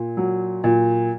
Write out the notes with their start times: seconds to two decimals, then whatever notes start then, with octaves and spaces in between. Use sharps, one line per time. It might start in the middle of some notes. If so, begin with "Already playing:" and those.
Already playing: A#2
0.17 F#3
0.64 A#2